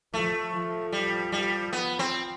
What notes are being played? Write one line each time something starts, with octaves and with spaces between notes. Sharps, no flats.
F3 A3
F3
G3
G3
B3
C4